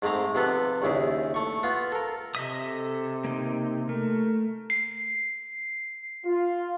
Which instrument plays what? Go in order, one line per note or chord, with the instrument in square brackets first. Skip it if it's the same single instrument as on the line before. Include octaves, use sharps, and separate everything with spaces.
[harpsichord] G#2 G#3 A3 C4 A#5
C3 F3 B3 A4 B4
A#1 D#2 C#3 E4 G#4
A3 C#6
B3 F4
A4 A#4
[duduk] C3 [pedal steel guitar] D#5 E5 D#6
[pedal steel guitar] A4
A#3 D#4
[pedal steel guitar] A3 [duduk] A#4
[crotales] C7
[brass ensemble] F4